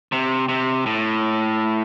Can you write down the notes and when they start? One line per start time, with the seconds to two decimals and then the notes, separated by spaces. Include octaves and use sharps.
0.12 C3
0.49 C3
0.86 A2